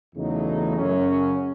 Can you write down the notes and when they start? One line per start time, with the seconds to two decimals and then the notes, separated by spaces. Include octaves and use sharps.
0.15 E2 C#3 F#3 A3 D#4
0.76 F#2 C#3 F#3 C#4